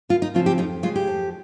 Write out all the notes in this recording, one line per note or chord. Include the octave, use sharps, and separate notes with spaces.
D#2 F4
D#4
C#3 F3 C4 F4
G4
F2 D#4
C#3 G#3 F4
G4
F2